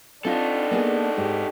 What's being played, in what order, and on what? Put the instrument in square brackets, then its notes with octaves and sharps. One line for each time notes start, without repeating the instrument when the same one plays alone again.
[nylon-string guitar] C4 F4 [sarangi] D4 [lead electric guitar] D#4 A4
[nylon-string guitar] A#3 B3 G#4
[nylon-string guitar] G#2 [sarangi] G4